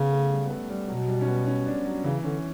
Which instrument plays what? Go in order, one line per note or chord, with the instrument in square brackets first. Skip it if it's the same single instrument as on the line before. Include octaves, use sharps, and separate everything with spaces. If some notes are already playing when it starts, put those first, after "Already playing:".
Already playing: [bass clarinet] C#3 [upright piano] B3 C#4
[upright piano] A3
G3
B3
A3
G3
[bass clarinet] B2 [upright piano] F#3
[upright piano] G3
C#4
B3
C#4
D4
F#3
[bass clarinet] C#3 [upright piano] E3
[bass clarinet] D3 [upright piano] C#4